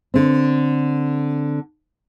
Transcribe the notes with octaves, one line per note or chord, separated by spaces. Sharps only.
D3 C4